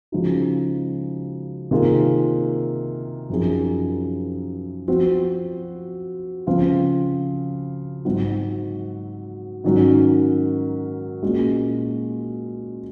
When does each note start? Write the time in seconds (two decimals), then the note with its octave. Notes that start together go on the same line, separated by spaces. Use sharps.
0.12 C#3 F3 G#3 D#4 F#4
1.71 C3 D#3 A#3 F4 G#4
3.30 F#2 F3 C4 D#4 G#4
4.88 F3 C4 F#4
6.47 C#3 F3 C4 F4
8.05 G#2 F#3 C4 F#4
9.64 G#2 D#3 F#3 C#4
11.22 A#2 G#3 C#4 F#4